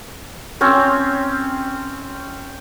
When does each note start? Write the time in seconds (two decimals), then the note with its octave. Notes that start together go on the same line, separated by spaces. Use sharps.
0.61 C4 C#4 C#5